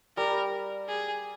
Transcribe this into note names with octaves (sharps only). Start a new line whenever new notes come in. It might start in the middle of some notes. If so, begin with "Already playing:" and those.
G3 A#4
G#4